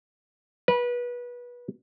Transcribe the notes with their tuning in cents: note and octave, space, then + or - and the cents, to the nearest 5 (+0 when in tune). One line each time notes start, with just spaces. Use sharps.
B4 -25